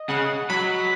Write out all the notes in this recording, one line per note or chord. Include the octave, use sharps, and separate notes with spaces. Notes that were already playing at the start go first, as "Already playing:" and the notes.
Already playing: D#5
C#3 F#5
F#3 B5